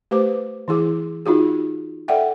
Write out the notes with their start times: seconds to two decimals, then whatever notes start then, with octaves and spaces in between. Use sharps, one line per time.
0.11 A3 G4 B4 C5 D6
0.68 E3 E4 G#4 D6
1.26 D#4 F4 F#4 G#4
2.08 A4 D5 E5 F#5 G5